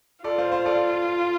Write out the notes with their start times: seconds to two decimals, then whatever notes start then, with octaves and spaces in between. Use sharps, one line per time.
0.24 F4 A4 D5
0.38 C5 F5
0.52 C5 F5
0.65 A4 D5